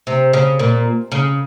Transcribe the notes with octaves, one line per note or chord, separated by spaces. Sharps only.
C3
C#3
A#2
C#3